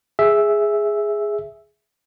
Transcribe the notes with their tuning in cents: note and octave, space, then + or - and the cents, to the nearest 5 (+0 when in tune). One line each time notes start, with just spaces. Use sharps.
G#4 +0 E5 +0